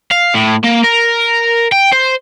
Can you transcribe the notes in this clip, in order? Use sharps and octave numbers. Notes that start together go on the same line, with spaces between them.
F5
A2
A#3
A#4
G5
C5